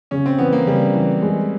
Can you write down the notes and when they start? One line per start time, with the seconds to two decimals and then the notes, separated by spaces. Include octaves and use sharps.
0.11 C#3 C#4
0.26 C4
0.38 E3 B3
0.53 A#3
0.66 C#3 G3
0.94 E3
1.22 G#3